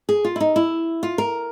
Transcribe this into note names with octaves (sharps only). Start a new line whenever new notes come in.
G#4
F4
E4
D#4
E4
F4
A#4